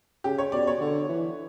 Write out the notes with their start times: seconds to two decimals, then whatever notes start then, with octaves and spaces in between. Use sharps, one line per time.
0.24 C#3 G4
0.38 C#5
0.52 B2 D5
0.67 C#5
0.81 D3
1.09 E3